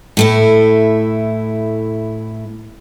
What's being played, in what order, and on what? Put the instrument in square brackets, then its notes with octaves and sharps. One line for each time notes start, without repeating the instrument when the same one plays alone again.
[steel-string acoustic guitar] A2 A3 E4